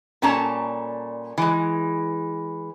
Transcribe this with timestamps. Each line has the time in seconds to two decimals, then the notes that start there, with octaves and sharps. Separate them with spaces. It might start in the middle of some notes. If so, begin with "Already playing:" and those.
0.22 A#2 G3 C#4 A4 A5 A#5
1.38 E3 G#3